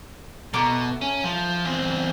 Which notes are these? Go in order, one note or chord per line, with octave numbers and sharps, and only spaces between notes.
B2 A3 A#5 D6
C#4
F3
E2 C4